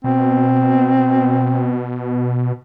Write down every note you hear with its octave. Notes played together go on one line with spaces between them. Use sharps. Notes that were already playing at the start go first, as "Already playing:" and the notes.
B2 C4